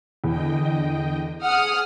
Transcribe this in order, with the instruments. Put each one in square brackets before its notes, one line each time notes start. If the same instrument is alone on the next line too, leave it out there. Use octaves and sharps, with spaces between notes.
[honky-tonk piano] E2 [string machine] D3 D#5 G5
[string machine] G#4 [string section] F#5 D#6 F6